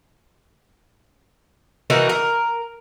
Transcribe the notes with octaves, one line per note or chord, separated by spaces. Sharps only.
E3 D#4 F#4 A#4
A#4